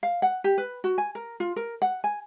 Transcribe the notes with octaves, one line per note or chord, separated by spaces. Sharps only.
F5
F#5
G4
B4
F#4
G#5
A#4
F4
A#4
F#5
G#5